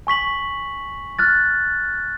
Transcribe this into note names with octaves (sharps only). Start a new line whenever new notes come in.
G#5 C#6 B6 F#7
F6 F#6 A6